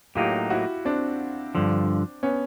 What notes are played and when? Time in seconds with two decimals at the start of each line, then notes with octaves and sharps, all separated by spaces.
0.15 A2 F#3 A#3 D#4 F4 G4
0.50 E4 F#4
0.85 C4 D4
1.55 G2 D3 F3
2.23 B3 C#4